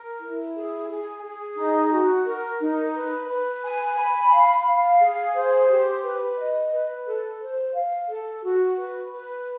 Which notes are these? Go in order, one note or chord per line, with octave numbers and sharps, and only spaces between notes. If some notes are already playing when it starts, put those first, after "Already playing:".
Already playing: A#4
E4
G#4
G#4
G#4
D#4
F#4
A#4
D#4
B4
B4
G#5
B5
F5
F5
G#4
C5
G4
B4
D#5
B4
A4
C5
F5
A4
F#4
B4
B4